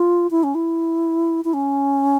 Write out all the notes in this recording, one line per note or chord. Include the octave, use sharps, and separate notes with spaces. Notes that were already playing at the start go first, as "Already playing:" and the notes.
Already playing: F4
E4
C#4
E4
E4
C#4